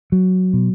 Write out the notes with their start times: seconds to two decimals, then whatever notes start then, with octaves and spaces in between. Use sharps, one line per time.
0.12 F#3
0.53 B2